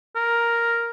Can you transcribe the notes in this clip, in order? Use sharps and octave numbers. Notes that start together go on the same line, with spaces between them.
A#4